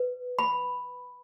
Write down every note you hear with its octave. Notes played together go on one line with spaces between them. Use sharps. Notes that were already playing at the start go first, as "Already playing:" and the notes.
Already playing: B4
B5